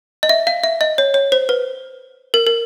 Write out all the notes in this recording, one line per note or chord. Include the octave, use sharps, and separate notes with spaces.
D#5
E5
F5
E5
D#5
C#5
C#5
C5
B4
A#4
A#4